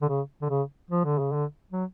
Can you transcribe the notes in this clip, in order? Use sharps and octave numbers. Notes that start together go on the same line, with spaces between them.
D3
C#3
D3
C#3
F3
D3
C#3
D3
F#3